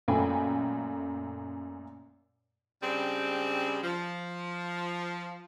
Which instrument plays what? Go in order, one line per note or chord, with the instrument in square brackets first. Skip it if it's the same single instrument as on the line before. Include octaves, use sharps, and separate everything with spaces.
[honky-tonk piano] F#2 A#2 A3 G5 G#5 B5
[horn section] C#3 G3 G#3 C4 D4
F3